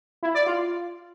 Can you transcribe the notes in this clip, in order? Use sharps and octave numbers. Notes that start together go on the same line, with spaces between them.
E4
D5
F4